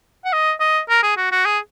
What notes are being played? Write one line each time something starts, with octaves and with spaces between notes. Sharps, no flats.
F#5
D#5
D#5
A#4
G#4
F#4
F#4
G#4